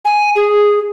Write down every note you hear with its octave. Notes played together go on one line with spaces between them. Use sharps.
G#5
G#4